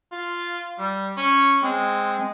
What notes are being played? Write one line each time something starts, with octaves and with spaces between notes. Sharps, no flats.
F4
G3
C#4
G#3 C4
G#3